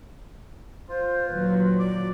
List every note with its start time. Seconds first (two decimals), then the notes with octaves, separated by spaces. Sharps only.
0.89 F4 C5
1.27 D#2 A#2 F#3 B4
1.79 D5 D6